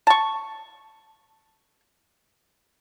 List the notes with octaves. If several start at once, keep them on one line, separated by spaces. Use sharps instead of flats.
A5 C#6